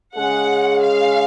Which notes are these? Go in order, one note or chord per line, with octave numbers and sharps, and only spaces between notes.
C#3 G#3 C#4 G#4 F#5
F5